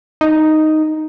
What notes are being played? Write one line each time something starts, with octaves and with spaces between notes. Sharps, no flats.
D#4